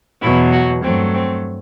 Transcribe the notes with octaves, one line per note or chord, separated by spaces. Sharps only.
E2 B2 F#3 E4
F#4
G2 F#3 A3 C4
C4